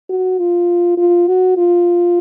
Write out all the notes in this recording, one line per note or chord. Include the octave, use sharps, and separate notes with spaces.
F#4
F4
F4
F#4
F4